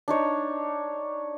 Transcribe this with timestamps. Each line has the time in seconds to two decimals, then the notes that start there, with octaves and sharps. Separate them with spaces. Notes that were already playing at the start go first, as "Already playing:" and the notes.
0.08 D4 D#4 C#5